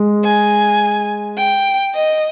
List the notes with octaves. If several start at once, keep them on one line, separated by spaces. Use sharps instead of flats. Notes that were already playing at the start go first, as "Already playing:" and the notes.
Already playing: G#3
G#5
G5
D#5